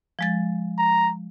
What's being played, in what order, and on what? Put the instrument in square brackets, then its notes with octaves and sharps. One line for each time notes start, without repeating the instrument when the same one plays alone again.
[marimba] F3 G#3 A6
[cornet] A#5